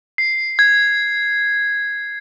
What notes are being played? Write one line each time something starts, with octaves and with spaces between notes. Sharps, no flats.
C7
G#6